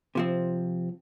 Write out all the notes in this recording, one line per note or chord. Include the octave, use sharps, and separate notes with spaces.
C3 F3 C4